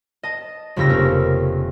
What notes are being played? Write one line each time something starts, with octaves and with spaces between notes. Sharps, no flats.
D#5 A5
F1 F2 C#3 G4 E6 A#6
A#3 C#4 A#4